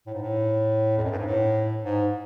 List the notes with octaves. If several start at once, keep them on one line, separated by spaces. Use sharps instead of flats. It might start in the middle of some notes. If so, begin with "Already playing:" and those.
A2
G#2
A2
F2
F#2
G2
G#2
A2
G#2